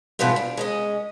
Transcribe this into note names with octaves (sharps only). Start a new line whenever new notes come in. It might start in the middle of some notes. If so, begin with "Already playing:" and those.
G#2 B2 E3 G3 B3 F4
D4
G#3 C#4 D#5